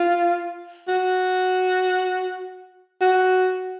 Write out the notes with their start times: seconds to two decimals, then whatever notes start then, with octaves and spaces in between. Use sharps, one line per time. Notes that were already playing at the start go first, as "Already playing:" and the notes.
Already playing: F4
0.88 F#4
3.01 F#4